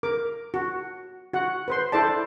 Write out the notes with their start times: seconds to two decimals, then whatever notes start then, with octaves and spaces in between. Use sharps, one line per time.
0.03 A#4 D6
0.54 F#4
1.33 F#4 F#5
1.68 B4 C5 C6
1.92 E4 A4 C5 D5 A5